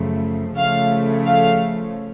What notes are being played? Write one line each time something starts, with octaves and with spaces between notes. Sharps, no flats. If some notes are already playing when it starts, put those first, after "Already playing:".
Already playing: F#2 C#3 F3 A3
C#3 F3 A3 C#4 F5
F5